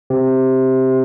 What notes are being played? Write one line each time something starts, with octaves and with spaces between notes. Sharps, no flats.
C3